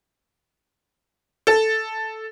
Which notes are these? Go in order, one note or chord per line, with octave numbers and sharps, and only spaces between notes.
A4